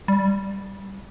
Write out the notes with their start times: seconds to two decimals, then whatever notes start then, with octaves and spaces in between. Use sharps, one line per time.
0.08 G3